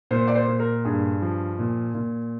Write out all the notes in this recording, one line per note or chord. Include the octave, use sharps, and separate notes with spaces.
A#2 C5
D5
C5
A#2
A#4
G2 G#4
F3
A#2
A#2